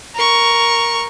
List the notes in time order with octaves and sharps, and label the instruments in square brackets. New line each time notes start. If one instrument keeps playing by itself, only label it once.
[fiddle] A#4 C#6